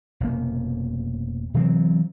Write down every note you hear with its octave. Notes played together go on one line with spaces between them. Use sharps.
F1 B2 A#3
C3 E3 F#3 C4